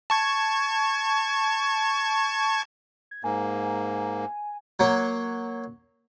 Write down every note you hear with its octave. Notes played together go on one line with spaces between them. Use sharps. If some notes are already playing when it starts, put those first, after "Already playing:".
A5 C#6 G#6
G#6
G#2 A#3 G#5
F#3 A#3